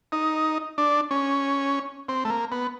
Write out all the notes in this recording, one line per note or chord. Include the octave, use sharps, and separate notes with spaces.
D#4
D4
C#4
C4
A3
A#3
B3